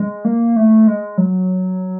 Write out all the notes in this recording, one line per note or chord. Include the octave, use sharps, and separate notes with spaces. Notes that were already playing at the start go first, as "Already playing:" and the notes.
Already playing: G#3
A#3
A3
G#3
F#3